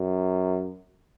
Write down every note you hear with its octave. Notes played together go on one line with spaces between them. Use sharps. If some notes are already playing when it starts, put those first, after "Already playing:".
Already playing: F#2